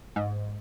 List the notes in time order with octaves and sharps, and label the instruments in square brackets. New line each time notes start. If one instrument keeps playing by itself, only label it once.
[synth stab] G#2